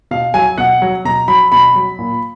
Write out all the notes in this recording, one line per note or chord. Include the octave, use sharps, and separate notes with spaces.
B2 F5
F#3 G#5
B2 F#5
F#3
B2 A#5
F#3 B5
B2 B5
F#3
A#2